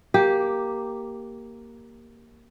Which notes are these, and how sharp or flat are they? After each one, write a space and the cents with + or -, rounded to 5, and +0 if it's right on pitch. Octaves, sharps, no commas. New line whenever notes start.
A#3 +0 G4 +0